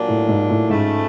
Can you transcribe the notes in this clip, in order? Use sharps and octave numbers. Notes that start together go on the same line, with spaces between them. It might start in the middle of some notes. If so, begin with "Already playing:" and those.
Already playing: A#2 F#3 A#3 D4
A2
G#2
A2
G#2 C#3 F3 A3